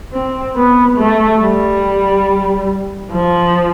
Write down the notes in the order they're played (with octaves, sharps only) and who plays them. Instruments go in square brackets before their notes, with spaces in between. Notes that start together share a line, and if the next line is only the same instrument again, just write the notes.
[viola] C4
B3
A3
G3
F3